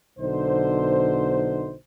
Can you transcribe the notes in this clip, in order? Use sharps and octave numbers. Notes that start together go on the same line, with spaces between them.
B1 B2 D3 D#4 C5